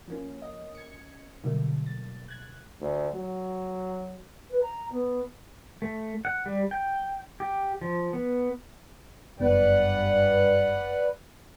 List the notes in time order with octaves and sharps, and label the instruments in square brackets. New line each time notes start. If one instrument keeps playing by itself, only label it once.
[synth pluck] F3 A#3 C#4
D#5
G#6 C#7
B2 D3 F#3 G3 A3 A#3
A6
F#6 G#6
[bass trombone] D2
F#3
[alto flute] B4
A#5
B3
[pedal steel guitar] A3
F#5
G3
G5
G4
F3
B3
[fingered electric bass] F#1 B3 [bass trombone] G2 [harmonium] B4 D5 [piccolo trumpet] F#5